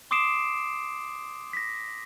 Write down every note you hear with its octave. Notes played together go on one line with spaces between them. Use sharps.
C6 D6 D#6 C7 D7 E7
A#6 B6